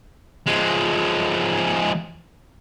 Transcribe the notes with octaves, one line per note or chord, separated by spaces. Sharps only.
F3 G#3